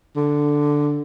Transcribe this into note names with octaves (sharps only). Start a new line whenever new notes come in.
D3